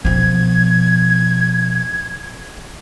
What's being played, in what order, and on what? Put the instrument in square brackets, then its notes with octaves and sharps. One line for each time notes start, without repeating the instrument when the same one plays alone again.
[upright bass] B2 F3 [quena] G#6